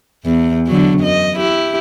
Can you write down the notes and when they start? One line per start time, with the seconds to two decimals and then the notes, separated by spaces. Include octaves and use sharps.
0.24 E2
0.67 D3 F#3
1.00 F#2 D#5
1.36 E4 G4